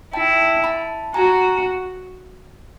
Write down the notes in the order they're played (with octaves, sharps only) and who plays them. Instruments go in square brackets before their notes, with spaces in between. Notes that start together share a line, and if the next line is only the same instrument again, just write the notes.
[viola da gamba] E4 [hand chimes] G5 A5
[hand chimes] A5 B5
[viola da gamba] F#4 [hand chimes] G#5 A#5